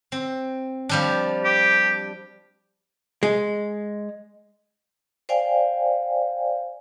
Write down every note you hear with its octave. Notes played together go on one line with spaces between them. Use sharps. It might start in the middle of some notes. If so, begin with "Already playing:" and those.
C4
F3 G3 D4
G4
G#3
C5 D5 F5 G5 G#5